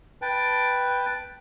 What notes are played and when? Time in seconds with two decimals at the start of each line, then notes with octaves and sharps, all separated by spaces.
0.22 B4 G5 A5